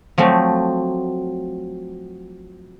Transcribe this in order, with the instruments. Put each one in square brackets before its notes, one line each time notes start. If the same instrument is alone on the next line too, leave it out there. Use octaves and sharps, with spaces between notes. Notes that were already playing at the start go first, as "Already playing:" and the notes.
[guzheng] F3 F#3 A3 C4